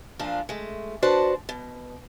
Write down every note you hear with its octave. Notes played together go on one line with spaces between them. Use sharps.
A#2 F3 D4 F4
G#3 A3
D4 F#4 B4 C5 D5 A5
B2